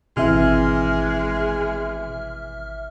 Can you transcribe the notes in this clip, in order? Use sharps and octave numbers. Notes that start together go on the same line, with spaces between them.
G#1 B2 E3 G#3 C4 E5 F6